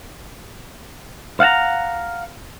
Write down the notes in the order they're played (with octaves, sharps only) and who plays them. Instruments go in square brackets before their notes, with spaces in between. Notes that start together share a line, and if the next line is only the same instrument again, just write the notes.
[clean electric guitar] F5 F#5 A5 A#5